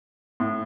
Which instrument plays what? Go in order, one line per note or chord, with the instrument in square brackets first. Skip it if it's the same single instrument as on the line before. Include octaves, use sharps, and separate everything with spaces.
[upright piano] A2